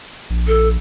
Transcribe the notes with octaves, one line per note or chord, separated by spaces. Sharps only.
A#1
A4